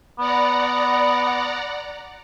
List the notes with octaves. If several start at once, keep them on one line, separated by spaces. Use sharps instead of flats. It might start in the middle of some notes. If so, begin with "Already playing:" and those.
B3 D5 F#5 A#5